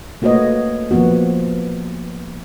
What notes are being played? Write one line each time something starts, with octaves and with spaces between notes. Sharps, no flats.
A3 A#3 F#4 B4 C#5 D#5
F3 A#3 B3 F#4